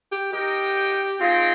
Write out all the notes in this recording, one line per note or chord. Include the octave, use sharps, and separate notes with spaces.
G4
D#4 G4 A#4 D#5 G5
C4 D#4 F4 G#4 D#5 G5